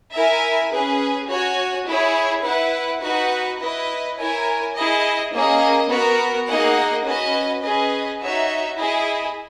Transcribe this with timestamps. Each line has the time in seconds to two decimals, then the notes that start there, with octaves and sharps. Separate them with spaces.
0.14 E4 A#4 E5 G#5
0.72 C#4 G#4 B4
1.29 F#4 C#5 G#5
1.87 E4 G#4 C#5
2.44 E4 B4 F#5
3.02 D#4 F#4 B4 F#5
3.60 E4 B4 D#5
4.17 E4 A#4 C#5 G#5
4.75 E4 G#4 D#5
5.33 A#3 C#4 G#4 D#5
5.90 B3 F#4 A#4
6.48 A#3 D#4 G#4 D#5 F#5
7.05 C#4 F#4 B4 D#5
7.63 C#4 G#4 B4 D#5
8.21 D#4 F#4 C#5 E5
8.79 E4 G#4 D#5